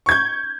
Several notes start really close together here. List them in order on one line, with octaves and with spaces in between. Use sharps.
C#6 G#6 G6